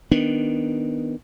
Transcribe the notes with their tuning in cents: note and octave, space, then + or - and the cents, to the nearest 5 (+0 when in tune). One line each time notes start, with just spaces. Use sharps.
D#3 +0 B3 +0 D4 +0